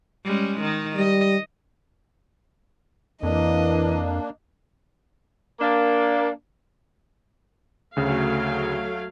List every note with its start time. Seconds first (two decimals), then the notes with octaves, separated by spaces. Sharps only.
0.25 G3 G#3 C#4
0.61 D#3 D#4
0.96 G3 D#5
3.23 F2 E3 A#3 D4 D#5
5.60 A#3 D4
7.96 D2 C#3 F#3 A3 F5